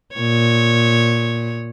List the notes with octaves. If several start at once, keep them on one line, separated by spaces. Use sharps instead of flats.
A#2 C#5